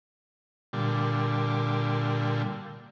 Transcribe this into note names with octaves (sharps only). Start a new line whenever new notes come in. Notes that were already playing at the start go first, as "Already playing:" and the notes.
A#2 D3 G3